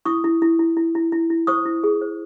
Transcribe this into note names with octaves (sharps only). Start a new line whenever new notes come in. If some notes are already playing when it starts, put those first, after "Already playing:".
E4 C#6 D#6
E4
E4
E4
E4
E4
E4
E4
C5 C#6 D#6
E4
G#4
C5